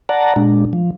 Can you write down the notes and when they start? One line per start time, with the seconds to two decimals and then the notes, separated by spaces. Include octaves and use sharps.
0.09 D5 F#5 A5 A#5
0.36 A#2 G#3 D4
0.73 F3